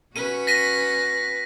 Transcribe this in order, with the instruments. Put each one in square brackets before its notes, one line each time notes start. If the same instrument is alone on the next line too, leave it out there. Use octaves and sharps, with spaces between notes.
[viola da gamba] C#4 F#4 B4 [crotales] D#7
[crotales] A#6 B6 D#7